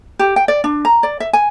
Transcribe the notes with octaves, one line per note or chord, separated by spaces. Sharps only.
G4
G5
D5
D4
A#5
D5
E5
G#5